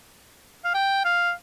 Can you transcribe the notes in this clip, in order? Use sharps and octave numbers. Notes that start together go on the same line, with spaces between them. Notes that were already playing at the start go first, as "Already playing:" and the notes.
F5
G5
F5